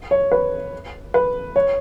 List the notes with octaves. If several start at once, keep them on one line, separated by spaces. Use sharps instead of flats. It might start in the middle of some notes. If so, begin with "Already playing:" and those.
C#5
B4
B4
C#5